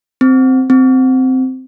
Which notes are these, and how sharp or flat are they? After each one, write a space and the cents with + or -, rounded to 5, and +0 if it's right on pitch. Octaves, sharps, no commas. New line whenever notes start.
C4 -5
C4 -10